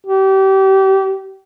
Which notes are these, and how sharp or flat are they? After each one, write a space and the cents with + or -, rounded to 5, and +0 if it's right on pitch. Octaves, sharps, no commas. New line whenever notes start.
G4 -30